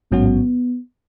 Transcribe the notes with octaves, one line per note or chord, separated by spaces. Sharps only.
A1 G#2 F#3 B3 C#4 F#4